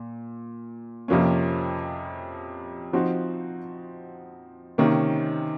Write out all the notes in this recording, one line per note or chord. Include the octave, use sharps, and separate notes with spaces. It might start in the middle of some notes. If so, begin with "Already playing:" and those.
Already playing: A#2
F2 C3 F3 A#3 C#4
F3 C4 D#4 F#4
C3 D#3 A#3 C#4